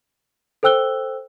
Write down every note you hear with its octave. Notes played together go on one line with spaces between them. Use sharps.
A4 C5 G5 E6 F#6 G7